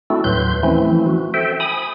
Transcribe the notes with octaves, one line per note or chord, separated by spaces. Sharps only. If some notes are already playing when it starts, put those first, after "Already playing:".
A3 C4 D4 E4 F#4 A4
D#2 A2 F#3 B4 C6 G6
E3 F3 A3 C4 C#4 E4
F#4
A4 C5 E5 G5
G#5 B5 D#6